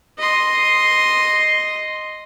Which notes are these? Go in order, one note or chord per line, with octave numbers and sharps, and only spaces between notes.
D#5 C6